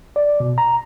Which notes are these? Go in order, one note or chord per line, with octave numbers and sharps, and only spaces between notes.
D5
B2
A#5